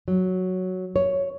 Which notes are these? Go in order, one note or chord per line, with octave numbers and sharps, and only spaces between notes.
F#3
C#5